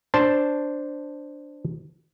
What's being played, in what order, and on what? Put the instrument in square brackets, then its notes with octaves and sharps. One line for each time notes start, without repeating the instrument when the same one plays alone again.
[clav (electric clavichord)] D4 C5 A5